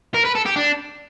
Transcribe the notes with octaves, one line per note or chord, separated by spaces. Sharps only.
A#4
B4
A4
G4
D4